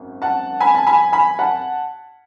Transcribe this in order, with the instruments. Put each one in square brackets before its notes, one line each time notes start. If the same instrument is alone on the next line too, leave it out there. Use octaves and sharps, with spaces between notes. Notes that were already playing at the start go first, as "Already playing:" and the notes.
Already playing: [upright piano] G#1 F#2
F#5 A5
G#5 B5
A5
G#5 B5
G#5 B5
F#5 A5